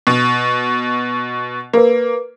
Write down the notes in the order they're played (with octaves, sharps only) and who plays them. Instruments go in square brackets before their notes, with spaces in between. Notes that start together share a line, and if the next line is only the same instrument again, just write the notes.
[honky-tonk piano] B2
[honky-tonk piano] A#3 [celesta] A#4 B4